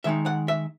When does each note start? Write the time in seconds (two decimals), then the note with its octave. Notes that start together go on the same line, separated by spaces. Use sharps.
0.04 D#3 G#3 D#4 E5
0.26 F#5
0.48 E5